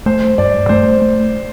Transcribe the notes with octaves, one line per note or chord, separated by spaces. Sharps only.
A3 C5
G2 D5
A3 C5
A3